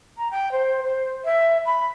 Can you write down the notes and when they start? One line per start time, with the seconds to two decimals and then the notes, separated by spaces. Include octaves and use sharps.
0.17 A#5
0.31 G5
0.52 C5
0.83 C5
1.25 E5
1.65 B5